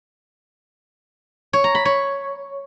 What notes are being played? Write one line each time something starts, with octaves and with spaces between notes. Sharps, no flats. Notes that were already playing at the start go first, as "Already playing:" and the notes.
C#5
A#5
B5
C#5